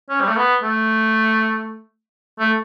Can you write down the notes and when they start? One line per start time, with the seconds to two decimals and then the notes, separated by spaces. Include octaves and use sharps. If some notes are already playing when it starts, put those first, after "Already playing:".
0.09 C#4
0.21 G3
0.28 A3
0.37 B3
0.63 A3
2.40 A3